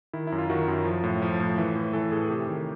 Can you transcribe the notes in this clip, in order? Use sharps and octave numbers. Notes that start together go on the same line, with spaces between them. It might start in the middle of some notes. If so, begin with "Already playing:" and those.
D#3 E4
F#2 E4
F4
D#3 F#4
F#2
F3
A2
F3
A2
E3
A2
E3 A4
A2 G#4
G#4
C3 G4
D#3